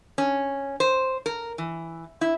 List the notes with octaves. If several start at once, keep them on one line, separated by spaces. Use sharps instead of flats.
C#4
C5
A#4
E3
E4